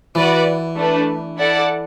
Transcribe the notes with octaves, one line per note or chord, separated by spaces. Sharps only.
E3 F#4 B4 D5
A3 D4 B4
E4 A4 D5 F#5